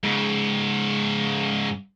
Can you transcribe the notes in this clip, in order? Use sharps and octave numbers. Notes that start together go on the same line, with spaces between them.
G#2 C#3